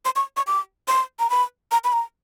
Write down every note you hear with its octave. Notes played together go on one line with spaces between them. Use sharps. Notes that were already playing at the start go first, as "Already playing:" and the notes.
C6
C#6
C#6
D6
C6
A#5
B5
A#5
B5
A#5